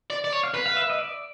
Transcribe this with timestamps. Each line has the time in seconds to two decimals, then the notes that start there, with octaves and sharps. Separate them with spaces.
0.10 D5
0.24 D5
0.33 C#5
0.44 F5
0.54 B4
0.66 F5
0.77 E5
0.90 D#5
0.99 D5